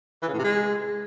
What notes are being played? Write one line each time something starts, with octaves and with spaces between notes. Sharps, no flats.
E3
C#3
A2
C3
G#3